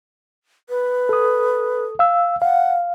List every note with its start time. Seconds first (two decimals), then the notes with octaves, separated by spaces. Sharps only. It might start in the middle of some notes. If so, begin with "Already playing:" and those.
0.70 B4
1.09 A4 D#6
1.99 F5 E6
2.42 F5 F#5